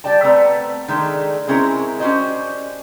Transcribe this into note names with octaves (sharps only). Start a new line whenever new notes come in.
G3 D5 G5 A5
A3 B3 C4 A#5
D#3 G#3 A3 D4
G#3 C4 C#4 E4 A#4
C#4 D4 F#4 G4 C5 D#5